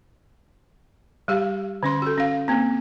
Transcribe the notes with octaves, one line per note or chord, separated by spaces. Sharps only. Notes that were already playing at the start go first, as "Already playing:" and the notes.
G3 G4 F5
D3 C#4 C6
F#4 A4
C#4 F5
A#3 C4